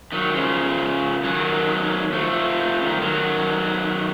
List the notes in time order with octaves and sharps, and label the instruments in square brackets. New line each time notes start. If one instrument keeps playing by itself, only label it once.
[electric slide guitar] D#3 F#3
C#3 F3
D#3 F#3
F3 A3
C#3
D#3
F3
D#3 F#3